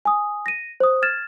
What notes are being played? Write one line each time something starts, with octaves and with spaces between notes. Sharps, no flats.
G#5 D#6
A#6 D#7
C5 D#6
F6 G#6 A6 E7